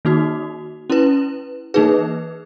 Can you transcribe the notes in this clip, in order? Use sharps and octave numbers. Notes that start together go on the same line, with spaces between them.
D#3 A#3 D#4 F#4
C#4 E4 B4
E3 A#3 D#4 G#4 B4